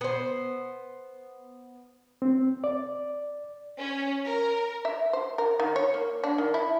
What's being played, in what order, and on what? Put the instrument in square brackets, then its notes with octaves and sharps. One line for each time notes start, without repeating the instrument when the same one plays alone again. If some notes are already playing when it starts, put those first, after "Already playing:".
[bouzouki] B3 C5
[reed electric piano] C4
D5
[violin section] C#4
A#4
[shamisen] E5
C5
A#4
D#3
C#5
A#3
D4
D#3
E4